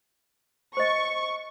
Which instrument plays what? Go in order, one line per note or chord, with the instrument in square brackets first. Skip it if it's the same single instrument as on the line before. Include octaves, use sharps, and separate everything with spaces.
[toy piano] C5 D#5 [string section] C#6